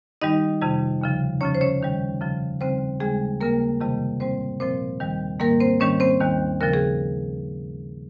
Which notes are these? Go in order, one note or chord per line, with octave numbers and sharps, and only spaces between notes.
G2 D#3 G3 D#4 D#5
F2 C3 D#3 G3
D#2 C#3 F3
F2 C#3 F3 C#4 C#5
C5
C#4 C#5
D#2 D#3 G3
F2 C#3 F3
D#2 C#3 G3 C4 C5
D#2 C#3 G3 G#3 G#4
D#2 C#3 G3 A#3 A#4
F2 C3 D#3 G3
G#2 G3 C4 C5
A#2 F3 C4 C5
D#2 D#3 G3
G#2 D#3 G3 A#3 A#4
C4 C5
G#2 D#3 G3 C#4 C#5
C4 C5
D#2 D#3 G3
D#2 C#3 F3 A#4
G#4